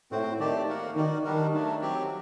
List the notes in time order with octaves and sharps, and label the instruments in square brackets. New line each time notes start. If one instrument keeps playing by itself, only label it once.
[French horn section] A2 [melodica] C4 F#4 C5
[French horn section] D#3 [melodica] A3 C4 G4 D5
[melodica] A#3 F#4 A#4 F#5
[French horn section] D#3 [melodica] D#4 F#4 A#4 D5
[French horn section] D#3 [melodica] G3 D4 F#4 A#4
[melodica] F#3 A3 D4
F#3 C4 G4